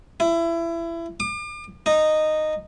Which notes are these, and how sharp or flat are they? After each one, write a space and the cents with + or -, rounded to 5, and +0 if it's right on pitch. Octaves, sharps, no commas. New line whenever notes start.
E4 +25
D6 +40
D#4 -10